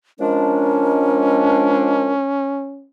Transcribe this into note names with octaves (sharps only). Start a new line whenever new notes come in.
F3 G#3 C#4 D4 A#4